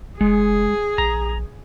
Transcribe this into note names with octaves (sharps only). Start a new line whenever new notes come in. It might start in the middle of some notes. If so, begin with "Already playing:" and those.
F1 G#3 G#4
A#1 A#5